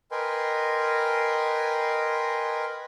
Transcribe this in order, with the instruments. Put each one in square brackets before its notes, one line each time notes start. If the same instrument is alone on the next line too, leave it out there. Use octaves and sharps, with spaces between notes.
[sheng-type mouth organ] A#4 B4 D#5 G5 G#5 C6